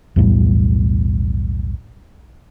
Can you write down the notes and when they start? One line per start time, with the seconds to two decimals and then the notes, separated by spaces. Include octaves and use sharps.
0.16 B1 E2 A2 G3